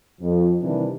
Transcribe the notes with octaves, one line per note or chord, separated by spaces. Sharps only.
F2
C3 D#3 E3 G3 D4